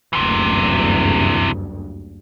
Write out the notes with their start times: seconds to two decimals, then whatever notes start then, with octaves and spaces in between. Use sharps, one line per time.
0.13 F#1 D2 G2 C3 E3